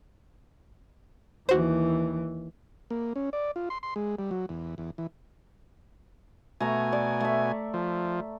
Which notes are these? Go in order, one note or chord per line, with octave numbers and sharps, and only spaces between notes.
D#2 E3 F#4 C5
A#3
C#4
D5
F4
C6
C6
G#3
G3
F#3
E2
E2
E3
B2 A3 G#5 A#5
D5
A3 E5
F3